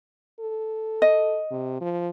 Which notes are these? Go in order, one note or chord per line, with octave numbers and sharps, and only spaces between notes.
A4
D#5
C3
F3